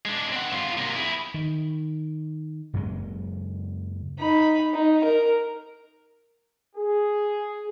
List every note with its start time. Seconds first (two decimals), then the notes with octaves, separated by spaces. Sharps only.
0.05 G#3 D4
0.32 C4 F#5
0.52 G2 F4
0.78 C3 A#3
0.95 E4 G#4
1.34 D#3
2.74 F#1 F#2 F#3 G#3
4.20 D#4 B5
4.74 D#4
5.04 A#4
6.76 G#4